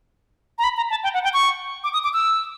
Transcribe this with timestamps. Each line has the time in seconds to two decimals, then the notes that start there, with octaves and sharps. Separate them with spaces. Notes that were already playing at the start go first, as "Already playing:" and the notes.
0.58 A#5
0.64 B5
0.77 A#5
0.90 A5
1.04 G5
1.14 F#5
1.24 G5
1.34 C#6
1.84 D6
1.93 D#6
2.04 D6
2.13 E6